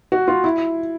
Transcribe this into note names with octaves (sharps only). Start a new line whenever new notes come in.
F#4
F4
E4